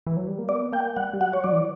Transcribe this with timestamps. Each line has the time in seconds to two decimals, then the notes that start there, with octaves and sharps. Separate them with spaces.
0.07 E3
0.17 F#3
0.27 G3
0.39 A#3
0.49 B3 D5
0.72 A#3 G5
0.96 G3 F#5
1.13 G3
1.20 F#3 F#5
1.33 C#5
1.44 F#3 D5
1.52 E3